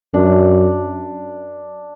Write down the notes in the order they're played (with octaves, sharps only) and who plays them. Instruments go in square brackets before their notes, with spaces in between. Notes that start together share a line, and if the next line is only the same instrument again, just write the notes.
[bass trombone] F#2 [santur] D4